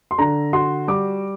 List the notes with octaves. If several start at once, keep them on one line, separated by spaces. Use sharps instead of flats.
C6
D3 A#5
F#4 C6
G3 D6